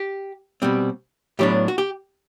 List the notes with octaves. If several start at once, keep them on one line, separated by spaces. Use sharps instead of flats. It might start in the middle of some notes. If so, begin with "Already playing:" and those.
Already playing: G4
B2 G3 C4
A2 F#3 B3 D4 G4
F#4
G4